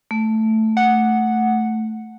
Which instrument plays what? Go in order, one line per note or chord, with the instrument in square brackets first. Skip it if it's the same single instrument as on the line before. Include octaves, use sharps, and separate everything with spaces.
[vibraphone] A3
[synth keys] F#5